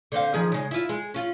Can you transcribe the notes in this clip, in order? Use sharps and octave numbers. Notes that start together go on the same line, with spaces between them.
D3 C4 F5
D#3 F3 G#4
C#3 G#3
E4 F4
G#3
C#4 F4